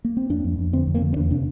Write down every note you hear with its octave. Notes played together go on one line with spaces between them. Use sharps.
A#3
C4
F2 D4
F2
F2
D3 C4
F2
A#3
D3
C4
E2 D4
C3 D4